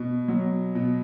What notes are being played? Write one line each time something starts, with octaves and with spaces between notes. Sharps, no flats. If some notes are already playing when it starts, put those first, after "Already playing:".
Already playing: B2
F#3
B2